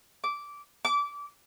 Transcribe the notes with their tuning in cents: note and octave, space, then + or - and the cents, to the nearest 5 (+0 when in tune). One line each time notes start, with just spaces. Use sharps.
D6 -15
D6 -25